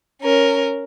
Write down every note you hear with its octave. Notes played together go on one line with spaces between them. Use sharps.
C#4 A#4